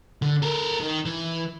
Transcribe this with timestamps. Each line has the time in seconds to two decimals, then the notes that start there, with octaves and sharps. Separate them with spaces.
0.22 D3
0.42 A4 A#4
0.80 D#3
1.05 E3